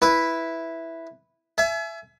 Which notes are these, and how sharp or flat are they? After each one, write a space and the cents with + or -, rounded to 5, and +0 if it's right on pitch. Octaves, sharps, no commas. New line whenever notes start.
E4 +0 B4 +0
E5 +20 G#5 +40